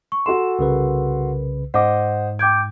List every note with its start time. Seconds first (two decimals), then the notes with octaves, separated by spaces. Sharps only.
0.12 C#6
0.26 F#4 A4 C6 E7
0.59 C2 C#3 A#4 B4
1.74 G#2 C5 D#5 F#5 D6
2.39 G5 D6 G6 G#6 D7